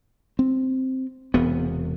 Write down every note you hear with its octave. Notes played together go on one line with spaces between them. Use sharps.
C4
E1 E2 C3 B3